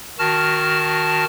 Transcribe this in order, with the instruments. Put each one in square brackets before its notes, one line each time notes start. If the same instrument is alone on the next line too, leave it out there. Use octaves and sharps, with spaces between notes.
[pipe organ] D#3 F#4 A5 F6